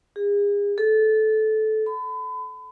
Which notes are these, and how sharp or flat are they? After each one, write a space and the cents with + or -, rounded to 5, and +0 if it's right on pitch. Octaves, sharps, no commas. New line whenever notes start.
G#4 -35
A4 -20
B5 +35